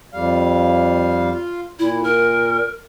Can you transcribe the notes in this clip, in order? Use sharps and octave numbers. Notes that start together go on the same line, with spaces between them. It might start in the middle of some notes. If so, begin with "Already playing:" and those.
F2 G3 F5
F4
A#2 E4
A#4